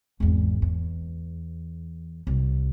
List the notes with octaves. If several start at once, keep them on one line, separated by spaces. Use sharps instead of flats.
G#1 E2
E2
C2